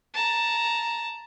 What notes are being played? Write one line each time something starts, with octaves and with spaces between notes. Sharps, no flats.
A5 A#5